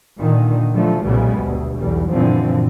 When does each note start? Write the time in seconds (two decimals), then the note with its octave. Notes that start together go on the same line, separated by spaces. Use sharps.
0.18 A#2 D3 D#3
0.74 D3 F3 F#3 A3
1.03 B1 A#2 C#3 G3 G#3 B3
1.37 G1 D2 B2
1.80 B1 E2 G3
2.12 F#2 A#2 D3 E3 F3 C4